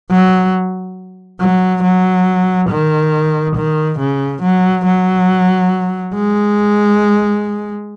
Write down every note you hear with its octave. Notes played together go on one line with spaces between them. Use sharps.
F#3
F#3
F#3
D#3
D#3
C#3
F#3
F#3
G#3